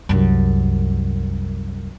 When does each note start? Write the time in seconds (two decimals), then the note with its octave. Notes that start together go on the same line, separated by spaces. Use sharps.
0.09 C2 F#2